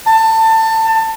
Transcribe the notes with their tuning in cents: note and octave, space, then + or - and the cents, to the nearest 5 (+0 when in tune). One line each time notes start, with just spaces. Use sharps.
A5 +25